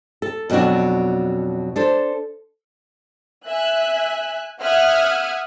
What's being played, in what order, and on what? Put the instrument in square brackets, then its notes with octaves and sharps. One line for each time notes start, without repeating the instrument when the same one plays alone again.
[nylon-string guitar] A4
F2 B2 F#3 D4 F#4
D4 A4 C5
[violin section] E5 G#5 F#6
E5 F#5 D#6 F6 F#6 G#6